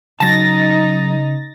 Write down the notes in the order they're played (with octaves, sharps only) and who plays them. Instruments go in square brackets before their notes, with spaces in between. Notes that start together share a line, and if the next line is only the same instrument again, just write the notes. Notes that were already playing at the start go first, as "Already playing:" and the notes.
[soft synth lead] C#3 [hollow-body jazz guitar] F#3 A5 [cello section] D#4 [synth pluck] A6 A#6